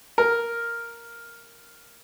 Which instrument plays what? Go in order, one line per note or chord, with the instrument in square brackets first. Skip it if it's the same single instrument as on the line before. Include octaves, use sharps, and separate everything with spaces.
[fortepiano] A#4